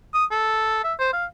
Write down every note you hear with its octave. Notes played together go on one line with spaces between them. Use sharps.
D#6
A4
E5
C5
F5